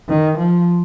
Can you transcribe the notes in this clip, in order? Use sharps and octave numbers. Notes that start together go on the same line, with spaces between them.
D#3
F3